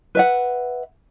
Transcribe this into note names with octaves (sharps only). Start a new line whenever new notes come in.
B4 E5 F#5